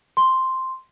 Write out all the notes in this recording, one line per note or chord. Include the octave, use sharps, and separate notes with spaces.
C6